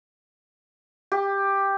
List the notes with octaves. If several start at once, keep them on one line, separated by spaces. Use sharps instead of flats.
G4